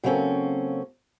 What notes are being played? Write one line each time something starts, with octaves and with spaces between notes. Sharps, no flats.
C#3 F#3 A#3 C4 C#4 A4